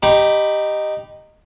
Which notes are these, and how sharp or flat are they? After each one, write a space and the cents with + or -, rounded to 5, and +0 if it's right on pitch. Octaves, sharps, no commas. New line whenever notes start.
D#4 -10 G4 +0 B5 +10